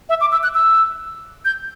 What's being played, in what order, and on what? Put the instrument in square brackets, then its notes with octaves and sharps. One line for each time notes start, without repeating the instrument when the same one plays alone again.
[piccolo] E5
D6
E6
F#6
E6
G6